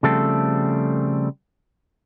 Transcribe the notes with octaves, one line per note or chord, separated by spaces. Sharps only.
C#3 F3 G3 A3 C4 A4